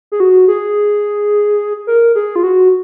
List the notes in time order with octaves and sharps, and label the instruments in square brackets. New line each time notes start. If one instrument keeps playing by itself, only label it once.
[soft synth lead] G#4
F#4
G#4
A#4
G#4
F4
F#4